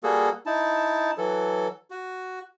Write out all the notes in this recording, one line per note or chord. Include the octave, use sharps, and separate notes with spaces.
G3 A#3 F#4 G#4 A4
D#4 E4 A5
E3 F#3 A4
F#4